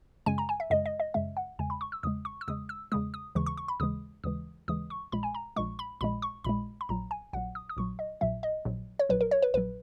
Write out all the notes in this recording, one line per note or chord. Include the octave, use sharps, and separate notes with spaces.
F#2 C#3 G#3 G#5
A#5
G#5
E5
F#2 C#3 G#3 D#5
D#5
D#5
F#2 C#3 G#3 E5
F#5
E2 C#3 G#3 G#5
B5
C#6
E6
E2 C#3 G#3 D#6
C#6
E6
E2 C#3 G#3 D#6
E6
E2 C#3 G#3 D#6
D#6
D#2 C#3 E3 G#3 C#6
C#6
C#6
B5
D#2 C#3 E3 G#3 D#6
D#2 C#3 E3 G#3 D#6
D#2 C#3 E3 G#3 D#6
C#6
A#1 A#2 G#3 B5
G#5
A#5
A#1 A#2 G#3 C#6
B5
A#1 A#2 G#3 B5
C#6
A#1 A#2 G#3 B5
B5
A#1 A#2 F#3 A#5
G#5
A#1 A#2 F#3 F#5
D#6
D#6
A#1 A#2 F#3 C#6
D#5
A#1 A#2 F#3 E5
D#5
A#1 A#2 F#3
C#5
A#1 A#2 F#3 B4
A#4
C#5
B4
A#1 A#2 F#3 B4